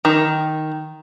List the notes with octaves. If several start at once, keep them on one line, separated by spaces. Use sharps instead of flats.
D#3